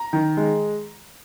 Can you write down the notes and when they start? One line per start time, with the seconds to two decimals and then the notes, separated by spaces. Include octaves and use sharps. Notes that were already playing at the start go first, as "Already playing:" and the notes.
Already playing: A#5
0.13 D#3
0.37 G#3